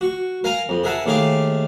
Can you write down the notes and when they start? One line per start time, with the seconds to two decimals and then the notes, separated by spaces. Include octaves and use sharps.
0.01 F#4 C#6
0.44 A#4 F5 G#5 A#5
0.69 F2
0.84 G#4 A#4 E5 F#5 G#5 A5
1.06 D#2 A3 G#4 F5 C6 D6